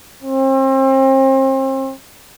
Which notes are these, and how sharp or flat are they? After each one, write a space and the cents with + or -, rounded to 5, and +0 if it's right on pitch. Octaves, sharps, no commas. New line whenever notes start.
C4 +35